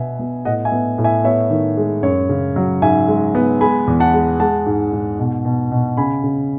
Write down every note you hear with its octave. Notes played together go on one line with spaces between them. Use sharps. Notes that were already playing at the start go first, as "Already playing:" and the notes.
Already playing: B2 B3 E5 G#5
B3
A2 D#5 F#5
E5 G#5
B3
A2
E5 G#5
B3 C#5 E5
D#3
G#3
F#2 C#5
C#3
F#3
G#2 E5 G#5
G#3
B3
G#3 G#5 B5
E2
F#5 A5
G#3
G#3 F#5 A5
G#2
G#2
B2
B2
B2
C#3 G#5 B5
C#3